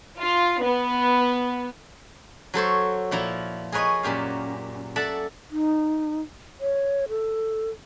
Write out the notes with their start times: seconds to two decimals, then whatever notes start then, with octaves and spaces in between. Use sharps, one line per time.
0.19 F4
0.61 B3
2.54 F#3 A4 C5 C#5
3.11 A#2 F3 E4 A#5
3.72 G#4 A#4 B4 C#5 D#5
4.03 F#2 A#2 G4 F5
4.96 A4 D5 E5 F#5 A5
5.51 D#4
6.60 C#5
7.09 A4